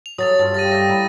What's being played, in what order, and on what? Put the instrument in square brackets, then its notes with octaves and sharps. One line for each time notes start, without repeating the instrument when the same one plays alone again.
[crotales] F7
[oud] F#3 [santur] F#4 A4 [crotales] D#6 A6 F7
[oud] G2 [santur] C#4 F4 G#4
[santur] C#4 F4 G4 [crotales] A6 A#6 D#7
[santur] A3 D5 G5 [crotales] A#6
[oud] E4 [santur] A#5 B5